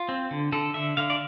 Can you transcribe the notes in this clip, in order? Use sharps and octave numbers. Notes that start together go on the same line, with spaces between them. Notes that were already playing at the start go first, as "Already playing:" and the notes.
Already playing: F4
C4
D3
D3 A4
D3 E5
D3 F5
D5